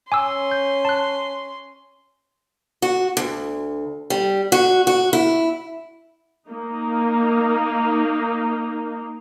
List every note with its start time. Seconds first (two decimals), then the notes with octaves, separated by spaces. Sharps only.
0.12 C#4 G#5 C6 D6 E6
0.51 G6
0.85 A5 F#6
2.82 F#4
3.17 D2
4.10 G3
4.52 F#4
4.87 F#4
5.13 E4
6.48 A#3 D#4